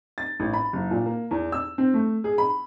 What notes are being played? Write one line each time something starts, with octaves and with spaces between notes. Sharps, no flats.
A6
A1
B5
F#1
A#2
A#3
E2
E6
C4
A3
G#4
B5